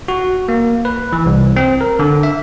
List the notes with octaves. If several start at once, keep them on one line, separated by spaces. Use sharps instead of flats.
F#4
A#3
B4
E3
C2
C4
A#4
D3
E5